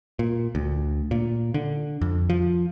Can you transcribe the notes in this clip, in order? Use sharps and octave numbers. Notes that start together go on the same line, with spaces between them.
A#2
D2
A#2
D3
F2
F3